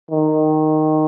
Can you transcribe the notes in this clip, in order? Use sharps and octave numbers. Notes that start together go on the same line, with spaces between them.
D#3